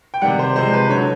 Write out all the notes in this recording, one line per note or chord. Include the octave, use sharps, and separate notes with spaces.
G5
C3 D#3 G3 F#5
C5
C3 F3 G#3 C5
B4
D3 F#3 C#5